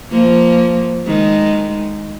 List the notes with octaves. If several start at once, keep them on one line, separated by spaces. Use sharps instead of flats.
F3 A#3
D#3 G#3